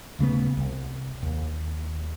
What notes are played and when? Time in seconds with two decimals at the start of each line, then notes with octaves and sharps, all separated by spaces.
0.19 D#1 C#3 A3 B3
0.57 C2
1.23 D#2